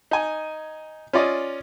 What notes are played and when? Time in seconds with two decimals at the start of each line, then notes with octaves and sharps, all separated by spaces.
0.11 D#4 G#5
1.13 C#4 F4 D5 D#5